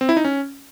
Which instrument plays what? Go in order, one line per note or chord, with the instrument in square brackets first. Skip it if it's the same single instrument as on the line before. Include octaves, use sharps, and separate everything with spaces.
[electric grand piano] C4
E4
D#4
C#4